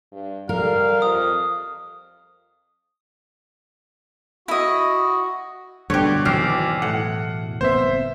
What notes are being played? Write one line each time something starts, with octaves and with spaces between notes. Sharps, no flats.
G2
G3 A#4 F5
F2 D#6
E4 F#4 D#5
G2 B2 D3 G4 C#5
G#1 E2 B2 F#3 G4 F6 C7
A2 F#5
F#1 B3 C4 C5 E5